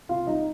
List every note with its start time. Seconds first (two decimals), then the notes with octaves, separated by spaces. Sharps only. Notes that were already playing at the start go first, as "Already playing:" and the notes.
0.09 C3 F4 F5
0.27 G3 C4 D#4 D#5